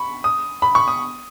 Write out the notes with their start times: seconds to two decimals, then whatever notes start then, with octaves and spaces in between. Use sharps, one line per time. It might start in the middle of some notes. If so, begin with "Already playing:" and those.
Already playing: B5 C#6
0.24 D#6
0.62 B5
0.75 C#6
0.88 D#6